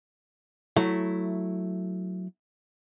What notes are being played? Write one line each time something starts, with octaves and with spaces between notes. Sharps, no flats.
F#3 A3 E4